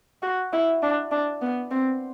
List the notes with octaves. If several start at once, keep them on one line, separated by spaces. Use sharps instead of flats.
F#4
E4
D4
D4
B3
C4